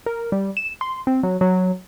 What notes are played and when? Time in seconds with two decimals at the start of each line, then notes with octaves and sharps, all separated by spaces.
0.06 A#4
0.32 G3
0.57 E7
0.81 C6
1.07 C4
1.23 F#3
1.41 F#3